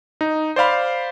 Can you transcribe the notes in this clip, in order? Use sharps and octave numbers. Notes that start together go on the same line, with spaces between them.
D#4
C5 D5 F5 B5